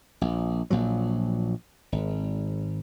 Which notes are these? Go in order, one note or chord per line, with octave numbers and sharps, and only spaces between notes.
A#1
A#1 A#2 F3 F#3
G#1